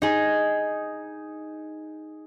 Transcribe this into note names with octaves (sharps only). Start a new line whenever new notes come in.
D#4 G#4